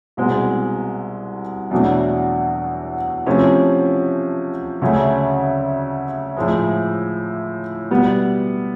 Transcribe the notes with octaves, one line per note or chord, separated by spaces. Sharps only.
C2 B2 G#3 C4
E2 B2 F#3 A3 D4
C3 F3 A3 C#4 E4
D2 C#3 F#3 A3 C#4
A2 F3 G#3
B2 G3 B3